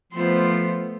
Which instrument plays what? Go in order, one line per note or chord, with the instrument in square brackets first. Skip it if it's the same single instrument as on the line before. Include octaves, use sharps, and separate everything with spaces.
[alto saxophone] F3 [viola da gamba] A3 B3 [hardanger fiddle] C5 C6